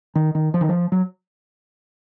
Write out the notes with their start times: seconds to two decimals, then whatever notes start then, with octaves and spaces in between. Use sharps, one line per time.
0.15 D#3
0.35 D#3
0.54 F3
0.61 D#3
0.69 F3
0.92 F#3